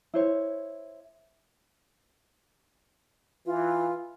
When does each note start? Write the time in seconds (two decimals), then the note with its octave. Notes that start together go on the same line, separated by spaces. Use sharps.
0.14 E4 C5 C#5
3.46 E3 F4